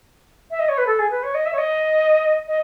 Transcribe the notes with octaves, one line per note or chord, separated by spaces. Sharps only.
E5
D#5
C#5
B4
A4
G#4
B4
C#5
D#5
E5
C#5
D#5
D#5